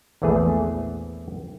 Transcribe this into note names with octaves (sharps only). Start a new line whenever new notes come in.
A#1 E2 E3 A3 G#4